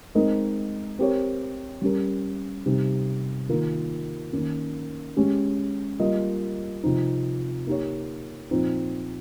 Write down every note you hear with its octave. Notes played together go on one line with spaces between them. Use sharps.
G#3 C4 D#4 A#4 D#5
C4 G4 A#4 C#5
G3 C#4 G4 A#4
C3 G3 C4 D#4 G4
D#3 A#3 F4 A#4
D#3 A#3 C#4
G#3 C#4 G4
G3 A#3 F4 A#4 D#5
C3 F3 C4 D#4
A#3 D#4 G4 C#5
A#2 F3 C4 D#4